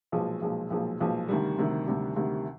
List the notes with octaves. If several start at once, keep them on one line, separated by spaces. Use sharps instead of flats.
B1 A#2 F3 G#3
B1 A#2 F3 G#3
B1 A#2 F3 G#3
B1 A#2 F3 G#3
D2 C3 D#3 G3
D2 C3 D#3 G3
D2 C3 D#3 G3
D2 C3 D#3 G3